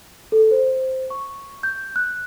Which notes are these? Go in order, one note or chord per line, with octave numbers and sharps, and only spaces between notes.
A4
C5
C#6
G6
F#6